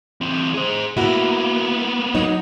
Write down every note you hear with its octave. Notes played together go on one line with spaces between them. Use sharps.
E3 C4
G#4 C5
A#3 B3 E4 F#4
F#3 D#4 C#5